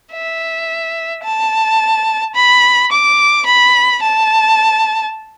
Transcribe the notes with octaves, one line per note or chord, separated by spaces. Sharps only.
E5
A5
B5
D6
B5
A5